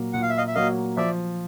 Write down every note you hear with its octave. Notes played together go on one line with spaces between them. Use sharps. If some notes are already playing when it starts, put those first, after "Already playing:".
Already playing: A#2 F#3 A#3
A#2 F#5
F5
E5
D#5 F5
E5
F#3 A#3 D#5 F5
F3 D5 E5